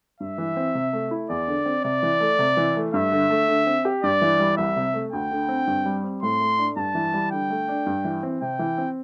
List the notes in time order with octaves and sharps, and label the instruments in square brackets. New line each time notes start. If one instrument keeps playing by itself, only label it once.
[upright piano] G2 [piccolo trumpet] E5
[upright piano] E3
C4
C3
A3
E4
[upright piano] E2 [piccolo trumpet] D5
[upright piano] D3
C4
[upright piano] C3 [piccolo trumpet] D5
[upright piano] E3
A3
C3
E3
A3
[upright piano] G2 [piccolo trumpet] E5
[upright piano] D3
A3
D3
C4
G4
[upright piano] G2 [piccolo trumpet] D5
[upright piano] E3
G3
[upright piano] C2 [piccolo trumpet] E5
[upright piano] C3
A3
[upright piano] D2 [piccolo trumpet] G5
[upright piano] D3
C4
G2
G3
C4
[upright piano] A2 [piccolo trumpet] C6
[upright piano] A3
D4
[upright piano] G2 [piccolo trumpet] A5
[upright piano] E3
G3
[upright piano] D3 [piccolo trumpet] G5
[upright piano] A3
D4
G2
E3
C4
[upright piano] C3 [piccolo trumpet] G5
[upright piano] E3
C4